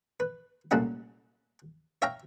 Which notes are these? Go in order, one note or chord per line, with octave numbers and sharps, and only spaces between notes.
B4
C2 A#2 F#3 A3 C#4 F#5
C#5 E5 F5 G5 A#5